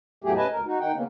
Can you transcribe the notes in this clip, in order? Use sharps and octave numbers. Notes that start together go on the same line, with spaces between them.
E2 A2 F#3 A3 G4 G#4
C#3 B4 D#5 G#5 A5
D2 A#4
D#4 F#4
D#3 D#4 F#5 G5
C#3 A#3 B3 C#4